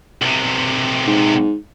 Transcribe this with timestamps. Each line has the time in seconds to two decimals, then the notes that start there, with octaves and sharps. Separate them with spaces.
0.22 B1 C3
1.07 G#2